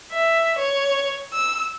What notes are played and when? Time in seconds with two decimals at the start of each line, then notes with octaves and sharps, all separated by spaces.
0.11 E5
0.58 C#5
1.32 E6